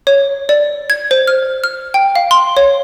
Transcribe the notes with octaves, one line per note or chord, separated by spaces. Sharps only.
C#5
D5
G#6
C5
F6
F6
G5
F5
C6
C#5